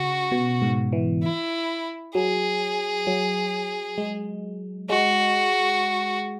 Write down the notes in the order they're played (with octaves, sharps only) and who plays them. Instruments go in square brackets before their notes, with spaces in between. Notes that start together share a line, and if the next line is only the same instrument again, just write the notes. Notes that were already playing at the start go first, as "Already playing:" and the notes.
Already playing: [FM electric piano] C#3 [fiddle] F#4
[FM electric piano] B2
G#2
E3
[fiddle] E4
[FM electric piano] F#3 [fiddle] G#4
[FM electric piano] F#3
G#3
[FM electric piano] G#3 [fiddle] F#4